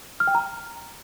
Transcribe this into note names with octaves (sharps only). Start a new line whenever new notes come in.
F6
G5
A#5